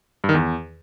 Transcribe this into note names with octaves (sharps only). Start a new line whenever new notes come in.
G2
D#3
E2